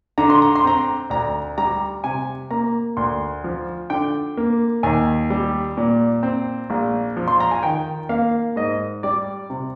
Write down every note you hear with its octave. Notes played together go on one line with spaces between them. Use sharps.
D3 A#5
C6
A#5
C6
C4 A#5
D2 A#5
G3 A#5
C3 G#5
A#3 A#5
D2 C6
F3
D3 G5
A#3
D#2 G#5
G3
A#2
C4
A#1
F3
C6
A#5
G#5
D#3 G5
A#3 F5
G#2 D#5
G3 D5
C3